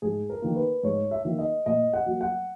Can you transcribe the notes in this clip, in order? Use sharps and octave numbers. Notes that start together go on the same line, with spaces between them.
G#2 G#4
A#4
D#3 A#3
B4
G#2 C#5
E5
D#3 A#3
D#5
A#2 D#5
F#5
F#3 A#3
F#5